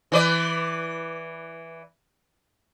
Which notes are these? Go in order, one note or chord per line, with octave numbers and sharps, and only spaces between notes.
E3 B4 D5